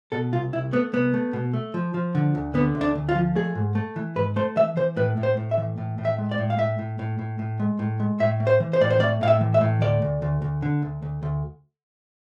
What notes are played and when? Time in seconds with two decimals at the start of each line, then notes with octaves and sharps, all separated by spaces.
0.12 B2 A4
0.33 C2 F4
0.53 C2 E4
0.72 A3 B3
0.93 C2 B3
1.14 A3
1.33 B2
1.53 A3
1.74 F3
1.94 F3
2.15 D3
2.35 D2
2.54 D3 B3
2.75 D2
2.81 D4
2.95 D2
3.09 F4
3.15 F3
3.35 A3 G#4
3.55 G#2
3.75 A3
3.96 E3
4.16 G#2 B4
4.36 A3 C5
4.56 E3 E5
4.77 E3 C5
4.96 A2 B4
5.17 A2
5.23 C5
5.37 A2
5.51 E5
5.58 E3
5.78 A2
5.98 A2
6.05 E5
6.18 G#3
6.31 D5
6.38 A2
6.50 F5
6.58 A2 E5
6.79 A2
6.99 A2
7.19 A2
7.39 A2
7.60 G#3
7.79 A2
8.00 G#3
8.20 A2 E5
8.40 A3
8.47 C5
8.60 E3
8.73 C5
8.81 A2 D5
8.90 C5
9.00 A3 D5
9.21 A2 F5
9.28 E5
9.41 E3
9.54 E5
9.61 A2
9.81 D2 D5
10.02 D2
10.22 D2
10.42 D2
10.62 D3
10.82 D2
11.02 D2
11.23 D2